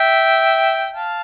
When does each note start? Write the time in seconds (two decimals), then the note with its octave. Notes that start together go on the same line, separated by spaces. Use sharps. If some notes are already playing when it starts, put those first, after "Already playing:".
Already playing: E5 G5
0.93 F5 A5